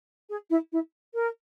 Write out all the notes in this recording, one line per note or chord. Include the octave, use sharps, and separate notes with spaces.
G#4
E4
E4
A#4